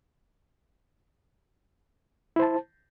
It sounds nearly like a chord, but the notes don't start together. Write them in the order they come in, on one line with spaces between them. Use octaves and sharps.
E4 C5 A5